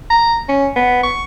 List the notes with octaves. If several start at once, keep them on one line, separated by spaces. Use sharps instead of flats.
A#5
C#4
B3
C#6